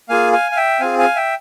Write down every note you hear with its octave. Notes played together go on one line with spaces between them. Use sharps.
A#3 F4 G#4 F5 G#5
F5 G#5
F5
E5 G5
C4 F4 G#4 F5 G#5
F5 G#5
E5 G5